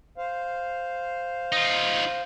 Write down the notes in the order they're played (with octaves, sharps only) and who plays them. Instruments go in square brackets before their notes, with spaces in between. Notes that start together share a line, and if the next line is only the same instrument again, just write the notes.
[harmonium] C5 F5
[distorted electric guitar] D#4 F4